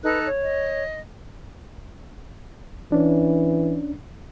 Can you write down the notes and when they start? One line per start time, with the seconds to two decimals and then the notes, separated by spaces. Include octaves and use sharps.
0.04 D#4 A4 B4 F#6
0.26 C#5
0.42 D#5
2.92 E3 C#4 D4